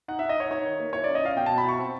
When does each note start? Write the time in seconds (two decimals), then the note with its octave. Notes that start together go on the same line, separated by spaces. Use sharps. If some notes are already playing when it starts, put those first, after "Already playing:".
0.08 D#4 F#5
0.19 D#4 E5
0.29 D#5
0.37 D#4 C#5
0.51 D#4 C#5
0.65 D#3
0.80 A#3
0.93 E4 C#5
1.04 C#4 D5
1.15 D#5
1.22 E4 F5
1.36 B2 G5
1.46 B2 A5
1.58 B5
1.65 E4 C#6
1.79 C4